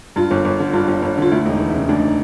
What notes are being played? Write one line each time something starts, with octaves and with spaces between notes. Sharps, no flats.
G2 F4
G1
G1
D3
G2 F4
G1
G1
D3 F4
D2 E4
E1 D#4
E3
E4
C#3
D2 D4
D#4